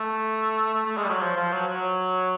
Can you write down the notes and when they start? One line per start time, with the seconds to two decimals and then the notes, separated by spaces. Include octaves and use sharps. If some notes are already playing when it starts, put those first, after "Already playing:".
Already playing: A3
0.74 A3
0.86 A3
0.97 G#3
1.04 G3
1.09 F#3
1.21 F3
1.37 F3
1.52 F#3
1.68 F#3